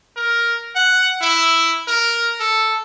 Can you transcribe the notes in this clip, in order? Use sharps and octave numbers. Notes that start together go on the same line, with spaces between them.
A#4
F#5
E4
A#4
A4